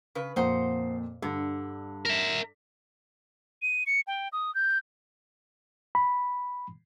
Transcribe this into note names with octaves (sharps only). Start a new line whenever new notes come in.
C#3 B4
F2 A#2 D#4 C5 F#5
G2 D3
A#4 E5
D#7
C#7
G5
D#6
G6
B5